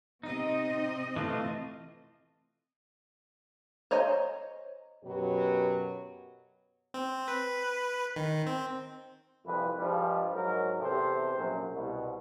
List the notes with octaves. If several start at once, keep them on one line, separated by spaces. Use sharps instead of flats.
C3 C4 D#4 D#5
E3 A3 F4
C5 C#5 D#5 G#5 A#5
F#2 B2 F#3 G4 B4
C4
B4
D#3
C4
C2 F2 E3 B4
G2 F3 G3 G#3
G#2 F#3 A#4
E2 C3 A4 C5
A#1 F#2
C2 B2